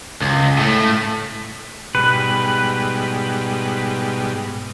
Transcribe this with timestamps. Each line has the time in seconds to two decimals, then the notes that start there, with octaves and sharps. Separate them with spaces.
0.22 C#2
0.58 A2 A3
1.95 G#2 B2 G3 B4